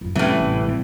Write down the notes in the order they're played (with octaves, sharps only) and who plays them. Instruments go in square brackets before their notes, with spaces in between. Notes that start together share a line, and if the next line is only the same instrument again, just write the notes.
[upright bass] F#2 F4
[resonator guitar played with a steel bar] A2 E3 [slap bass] C3 C#4 [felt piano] G3 [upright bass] B3
[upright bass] A1 D2
[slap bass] C3 G3 C4